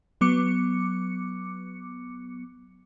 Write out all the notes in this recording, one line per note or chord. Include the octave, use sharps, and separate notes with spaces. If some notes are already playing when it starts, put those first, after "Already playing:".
F#3 B3 D6 C#7